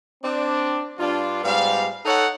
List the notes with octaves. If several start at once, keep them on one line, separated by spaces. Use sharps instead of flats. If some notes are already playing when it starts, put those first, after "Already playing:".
C4 D4
G2 D4 F4
G#2 G3 B3 F5
D#4 A4 C#5 F#5